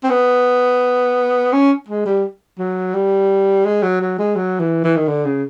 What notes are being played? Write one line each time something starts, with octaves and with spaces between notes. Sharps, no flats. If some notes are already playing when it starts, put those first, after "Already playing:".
C4
B3
C#4
G#3
G3
F#3
G3
G#3
F#3
F#3
G#3
F#3
E3
E3
D#3
D3
C#3